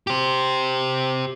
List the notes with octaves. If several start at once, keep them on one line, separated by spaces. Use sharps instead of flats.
G4 C5